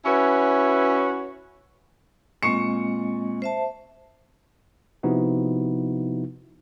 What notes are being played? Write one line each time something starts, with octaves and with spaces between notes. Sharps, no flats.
C#4 E4 F#4 B4 C#5
A#2 G#3 C4 D#5 C#6 C#7
C5 E5 A5
C3 F3 B3 D#4 E4 F#4